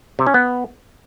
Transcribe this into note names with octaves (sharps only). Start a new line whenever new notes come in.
C3
C#4
B3